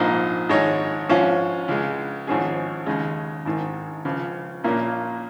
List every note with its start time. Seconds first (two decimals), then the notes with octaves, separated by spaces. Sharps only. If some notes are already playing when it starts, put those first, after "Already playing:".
Already playing: A#1 G#2 F3 A#3 D#4
0.49 G#1 G#2 G#3 D#4 C#5
1.09 G#2 F3 C#4 F4
1.68 C#2 C#3 G#3
2.27 G#1 G#2 F3 C#4 G#4
2.86 D#2 C#3 G#3
3.45 G#1 G#2 D#3
4.05 C#2 C#3 F3
4.64 A#1 A#2 A#3 C#4 F4